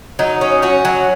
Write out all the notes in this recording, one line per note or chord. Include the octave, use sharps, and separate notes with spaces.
F#3 D#4
C#4
C#4 F#4
F#3